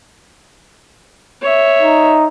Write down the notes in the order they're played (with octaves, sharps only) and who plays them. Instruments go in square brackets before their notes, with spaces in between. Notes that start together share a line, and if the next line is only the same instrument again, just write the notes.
[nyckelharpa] C#5 E5
[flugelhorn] D#4